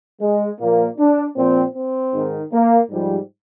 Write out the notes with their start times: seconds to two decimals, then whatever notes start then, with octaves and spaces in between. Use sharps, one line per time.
0.22 G#3
0.59 A#2 F3 A#3
0.98 D4
1.36 A#2 F3 C4
1.76 C4
2.13 G#2 D#3
2.53 A#3
2.90 G#2 F3 G3